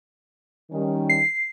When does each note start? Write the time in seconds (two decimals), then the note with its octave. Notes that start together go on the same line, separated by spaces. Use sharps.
0.72 D#3 G3 C#4
1.09 C7